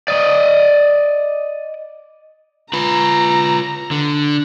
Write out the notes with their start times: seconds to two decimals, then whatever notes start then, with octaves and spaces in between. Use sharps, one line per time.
0.08 D5 D#5
2.73 F4 B4 A#5
3.91 D3